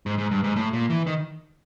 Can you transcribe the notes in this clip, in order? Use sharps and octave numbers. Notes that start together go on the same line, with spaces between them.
G#2
G#2
G2
G#2
A2
A#2
E3
D#3